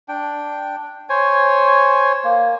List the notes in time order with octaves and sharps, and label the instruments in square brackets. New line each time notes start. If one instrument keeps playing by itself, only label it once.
[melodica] D4 G5
C5 C#5 G#5
A#3